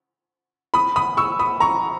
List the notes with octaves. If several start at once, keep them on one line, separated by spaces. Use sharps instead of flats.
B5 D#6
B5 D#6
C#6 E6
B5 D#6
A#5 C#6